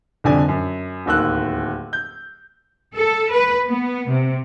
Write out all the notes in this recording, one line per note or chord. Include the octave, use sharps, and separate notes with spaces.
C2 F2 D3 D5 G#5
F#2
D1 D#2 E6 F#6
G6
A4
B4
B3
C3